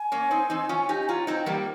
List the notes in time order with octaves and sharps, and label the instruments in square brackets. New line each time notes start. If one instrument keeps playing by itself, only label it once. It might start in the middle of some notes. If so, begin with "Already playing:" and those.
Already playing: [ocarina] G#5
[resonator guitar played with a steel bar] A#3 C#4
C4 D#4
C4 D#4
C#4 F4
D#4 G4
[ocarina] G#5
[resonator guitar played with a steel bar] C#4 F4 [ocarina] A#5
[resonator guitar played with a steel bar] C4 D#4
[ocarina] G5
[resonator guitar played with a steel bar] G3 A#3